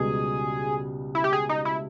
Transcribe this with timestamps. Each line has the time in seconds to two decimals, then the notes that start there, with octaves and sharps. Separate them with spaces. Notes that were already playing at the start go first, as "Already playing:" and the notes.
Already playing: C#2 B2 G3 B3 G#4
1.15 E4
1.24 G4
1.33 G#4
1.49 D#4
1.65 E4